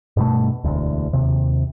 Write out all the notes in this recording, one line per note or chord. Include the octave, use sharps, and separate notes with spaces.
G2 B2 A3
E1 D2
D#2 C3